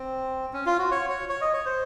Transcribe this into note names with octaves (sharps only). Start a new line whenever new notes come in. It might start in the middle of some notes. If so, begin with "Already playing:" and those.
Already playing: C4
C#4
F4
F#4
C#5
C#5
C#5
D#5
C#5
C5